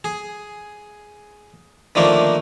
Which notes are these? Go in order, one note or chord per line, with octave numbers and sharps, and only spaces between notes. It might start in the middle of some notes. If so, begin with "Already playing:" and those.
G#4
D3 D#3 F3 A3 A#3 D4